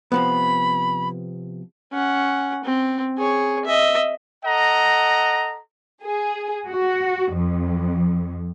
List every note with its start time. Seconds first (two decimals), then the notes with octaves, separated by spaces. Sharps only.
0.12 C3 F3 B3 B5
1.92 C#4 F#5
2.64 C4
3.17 G#4 C#5
3.65 D#5 E5
4.44 A4 D#5 F#5 A#5
6.03 G#4
6.69 F#4
7.34 F2